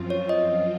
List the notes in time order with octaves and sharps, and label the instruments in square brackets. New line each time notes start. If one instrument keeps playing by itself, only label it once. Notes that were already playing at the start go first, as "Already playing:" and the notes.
Already playing: [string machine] F#2 F3 C4 F4
[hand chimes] C#5
D#5